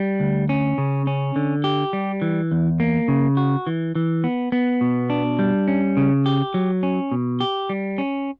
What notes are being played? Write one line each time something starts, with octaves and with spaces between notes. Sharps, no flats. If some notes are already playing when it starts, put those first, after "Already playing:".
Already playing: G3
D2
C#4
C#3
C#4
D3
G4
G3
E3
E2
A#3
C#3
F#4
E3
E3
B3
B3
B2
D4
G3
C#4
C#3
G4
F#3
C#4
B2
G4
G3
C#4